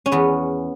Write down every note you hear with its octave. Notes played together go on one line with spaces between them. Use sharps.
C#4
E2 B3